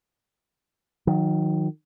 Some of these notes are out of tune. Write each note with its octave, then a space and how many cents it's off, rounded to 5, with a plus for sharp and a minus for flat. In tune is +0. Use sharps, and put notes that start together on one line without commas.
D#3 +0 F#3 -35